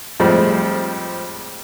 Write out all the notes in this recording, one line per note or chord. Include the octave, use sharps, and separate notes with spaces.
F2 A2 F3 G3 G#3 C4